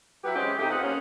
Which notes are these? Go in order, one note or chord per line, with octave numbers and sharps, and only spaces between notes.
F#3 B3 E4 G4 B4
E3 G#3 C4 C#4 G4
C3 A3 D#4 G4
F2 F3 B3 D#5 F#5
A#3 C4 C#4